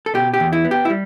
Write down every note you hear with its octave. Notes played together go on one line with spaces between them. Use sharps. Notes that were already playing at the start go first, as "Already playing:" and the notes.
A4
B2 G4
G4
E2
E4
B3
G4
E4
G3